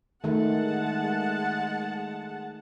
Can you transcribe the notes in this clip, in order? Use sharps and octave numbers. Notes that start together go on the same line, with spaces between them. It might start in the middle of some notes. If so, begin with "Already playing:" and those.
D#3 G#3 A3 F#5 A5